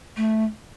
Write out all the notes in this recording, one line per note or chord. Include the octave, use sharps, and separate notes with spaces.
A3